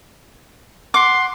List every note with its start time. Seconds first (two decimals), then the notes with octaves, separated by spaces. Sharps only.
0.94 F#5 C6 D6